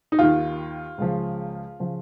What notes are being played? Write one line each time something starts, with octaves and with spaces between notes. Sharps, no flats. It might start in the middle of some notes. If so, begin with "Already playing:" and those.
D#4
D#2 D#3 F4
C#2 C#3 F3
C#3 F3